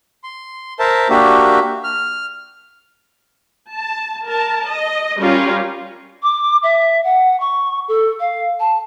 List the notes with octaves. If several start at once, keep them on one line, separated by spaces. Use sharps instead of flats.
C6
A#4 C5 E5 A5
A#3 D4 F#4 G4 E5
F6
A5
A#4 A5
D#5
G3 C#4 F4 A#4
D6
E5
F#5
C#6
A4
F5
A5